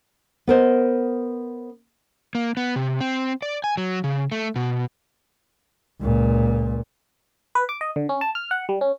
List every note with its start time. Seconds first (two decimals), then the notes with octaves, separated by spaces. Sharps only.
0.47 B3 A#4 C5 D#5
2.35 A#3
2.57 B3
2.76 C3
3.01 C4
3.42 D5
3.64 G#5
3.77 F#3
4.04 C#3
4.32 A3
4.56 B2
6.02 C#2 A#2
7.55 B4
7.69 D6
7.81 D#5
7.96 D3
8.09 C#4
8.21 A5
8.35 F6
8.51 F#5
8.69 G3
8.81 C#4